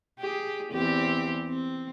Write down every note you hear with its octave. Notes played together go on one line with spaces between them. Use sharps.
G4 G#4
E2 C4 G4
C4